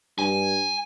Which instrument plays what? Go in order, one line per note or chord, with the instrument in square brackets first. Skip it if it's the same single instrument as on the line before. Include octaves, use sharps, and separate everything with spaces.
[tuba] G2 [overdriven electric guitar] G#5